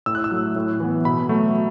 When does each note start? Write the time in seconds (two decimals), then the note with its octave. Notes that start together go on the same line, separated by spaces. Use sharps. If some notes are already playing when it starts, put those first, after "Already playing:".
0.06 A2 E6
0.15 F#6
0.24 E6
0.31 F#3 A3
0.56 A2
0.80 E3 B3
1.05 B2 B5
1.29 F#3 A3